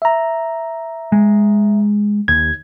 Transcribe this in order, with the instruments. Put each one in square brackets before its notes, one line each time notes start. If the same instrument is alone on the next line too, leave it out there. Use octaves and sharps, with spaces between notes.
[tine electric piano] E5 A#5
[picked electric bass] G#3
[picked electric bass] D#2 [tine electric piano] G#6